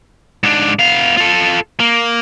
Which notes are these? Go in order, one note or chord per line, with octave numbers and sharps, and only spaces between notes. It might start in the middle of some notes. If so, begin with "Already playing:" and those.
G#2 D4
B3 F5
F4 A4
A#3